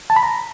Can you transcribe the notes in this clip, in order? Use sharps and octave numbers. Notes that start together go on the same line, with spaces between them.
A5
B5
A#5